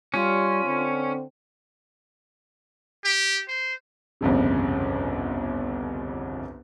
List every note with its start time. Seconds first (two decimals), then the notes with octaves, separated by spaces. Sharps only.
0.14 G3 C#4 F4
0.64 D3 C4
3.04 G4
3.48 C5
4.21 G1 C2 F2 C#3